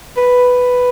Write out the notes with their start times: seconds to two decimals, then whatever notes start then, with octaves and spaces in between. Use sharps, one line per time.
0.17 B4